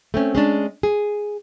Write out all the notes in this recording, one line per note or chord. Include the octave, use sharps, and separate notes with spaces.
A3 C4 C#4
G#3 C#4 D4
G#4